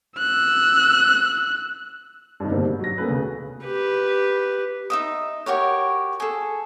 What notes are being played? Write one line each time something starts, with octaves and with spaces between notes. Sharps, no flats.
E6 F#6
G2 C3 D#3
G#2 B2 D3 G3 A#3 C4
G4
F#3 A#6
A#3 B3 C#4 A4 B4
D2 C#3
G4 B4
D#4 E5 D#6
F#4 G4 A#4 C#5
G#4 A4